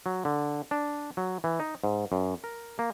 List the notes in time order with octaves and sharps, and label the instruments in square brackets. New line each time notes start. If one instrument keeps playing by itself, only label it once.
[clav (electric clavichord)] F#3
D3
D4
F#3
E3
D#4
G#2
F#2
A#4
A#3